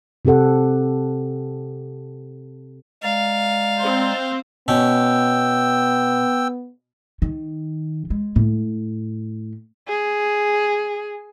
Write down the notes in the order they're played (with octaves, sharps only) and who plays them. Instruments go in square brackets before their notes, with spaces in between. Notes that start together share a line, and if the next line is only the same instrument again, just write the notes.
[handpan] C3 C4 G4 A4 F#5
[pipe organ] G#3 D5 A#5 [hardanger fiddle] F5
[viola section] C4 C5
[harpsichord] B2 C#4 [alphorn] B3 [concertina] G5 E6
[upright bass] D#3
G#3
A2
[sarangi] G#4